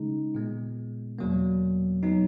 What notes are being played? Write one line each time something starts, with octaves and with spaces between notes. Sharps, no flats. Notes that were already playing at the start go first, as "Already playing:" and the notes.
Already playing: C#3 G#3 D#4
A#2 G#3 B3
E2 B2 F#3 A#3
B2 F#3 B3 D#4